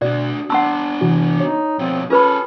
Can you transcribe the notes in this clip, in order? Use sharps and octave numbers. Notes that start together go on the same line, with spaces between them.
B2 D4 F#4 D5
B3 D4 F#5 A5 C6 E6
C3 E3 F#4
D#4 C#5
B2 F3 C4
C#4 F4 G#4 A4 B4 B5